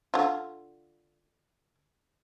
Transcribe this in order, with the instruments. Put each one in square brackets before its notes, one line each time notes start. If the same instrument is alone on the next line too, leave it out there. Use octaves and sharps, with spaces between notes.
[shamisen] D3 F4